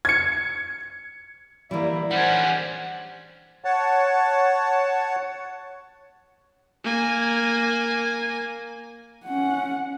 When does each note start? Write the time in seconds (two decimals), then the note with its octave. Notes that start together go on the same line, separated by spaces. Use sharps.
0.05 G#6 C#7
1.71 E3 G3 A#3 E4 D5
2.11 G3 C#4 D4 C5 F#5
3.65 C#5 F#5 A5
6.84 A#3 G#5
9.25 C#4 F#5